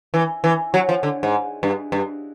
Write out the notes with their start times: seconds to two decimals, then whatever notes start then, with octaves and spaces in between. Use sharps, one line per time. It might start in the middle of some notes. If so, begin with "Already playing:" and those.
0.14 E3
0.44 E3
0.74 F#3
0.89 F3
1.03 D3
1.23 G#2
1.63 G2
1.92 G2